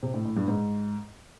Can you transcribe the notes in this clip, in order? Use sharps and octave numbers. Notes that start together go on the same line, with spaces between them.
C3
A2
A2
G2
G#2